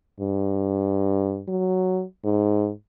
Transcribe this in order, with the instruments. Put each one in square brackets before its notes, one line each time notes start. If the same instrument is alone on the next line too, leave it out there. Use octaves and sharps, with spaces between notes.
[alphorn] G2
F#3
G#2